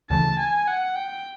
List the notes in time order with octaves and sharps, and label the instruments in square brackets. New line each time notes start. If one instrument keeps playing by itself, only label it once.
[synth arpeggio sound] D2 C#3 E3 A3 [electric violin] A5
[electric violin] G#5
F#5
G5